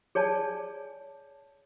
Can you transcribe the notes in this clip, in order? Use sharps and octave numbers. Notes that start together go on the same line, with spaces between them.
G#4 C#5 D5 G#5 A5